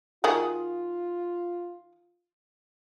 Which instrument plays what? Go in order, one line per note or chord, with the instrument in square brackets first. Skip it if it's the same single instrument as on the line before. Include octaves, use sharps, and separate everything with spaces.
[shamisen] D#3 F#4 G#4 [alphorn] F4